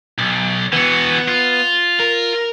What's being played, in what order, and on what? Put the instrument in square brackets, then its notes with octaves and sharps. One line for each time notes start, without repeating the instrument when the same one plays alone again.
[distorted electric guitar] B1
[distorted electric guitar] E3 F#4 [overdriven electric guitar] B3
[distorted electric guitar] F4
[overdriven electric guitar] A#4